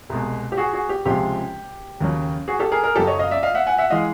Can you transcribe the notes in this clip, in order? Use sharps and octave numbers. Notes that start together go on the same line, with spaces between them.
C2 B2 G#3
G4
F#4 G#4
F#4 G#4
G4
C#2 C3 F3 G#3 G4
D#2 C#3 F#3
F#4 G#4
G4 A4
G#4 A#4
G#4 A#4
F#2 C#3 F#3 G4 A4
C#5 D#5
D#5 F5
D5 E5
D#5 F5
E5 F#5
F#5 G#5
E5 F#5
E3 G#3 D#5 F5